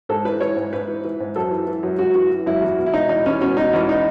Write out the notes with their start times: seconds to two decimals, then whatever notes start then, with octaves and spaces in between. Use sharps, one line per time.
0.09 G#2 A4
0.25 E3 B4
0.41 E3 C#5
0.56 G#2
0.73 G#2 B4
0.88 E3
1.04 E3
1.20 G#2
1.36 F#2 A4
1.51 E3
1.67 E3
1.83 F#2
1.99 F#2 F#4
2.15 E3 F#4
2.31 E3
2.46 F#2 E4
2.62 E2 F#4
2.78 B2
2.86 E4
2.94 B2 D#4
3.09 E2 D#4
3.26 E2 C#4
3.41 B2 C#4
3.57 B2 D#4
3.73 E2 C#4
3.89 D#4